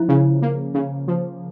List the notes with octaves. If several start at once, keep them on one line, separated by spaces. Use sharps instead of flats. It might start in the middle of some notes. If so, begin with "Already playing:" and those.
Already playing: F3 E4
C#3
A#3
C#3
F3